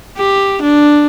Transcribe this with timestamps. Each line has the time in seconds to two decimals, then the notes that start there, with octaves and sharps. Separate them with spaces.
0.18 G4
0.62 D4